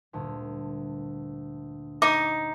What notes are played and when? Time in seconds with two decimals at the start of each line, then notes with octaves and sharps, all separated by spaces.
0.13 D2 G2 A#2
2.02 D#4 D6